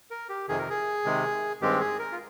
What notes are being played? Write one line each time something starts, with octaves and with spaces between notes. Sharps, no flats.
A#4
G4
F2 C3 D#3 G#4
A#4
G#4
C3 D#3 G#3
G2 D#3 G#3 C4 G4
G#4
A#4
F4